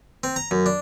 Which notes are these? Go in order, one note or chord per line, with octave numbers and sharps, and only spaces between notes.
C4
A#5
F#2
D4